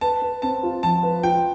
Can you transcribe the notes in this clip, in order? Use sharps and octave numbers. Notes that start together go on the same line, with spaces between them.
B4 A5
B4
C4 A5
F4
F3 A5
B4
F4 G5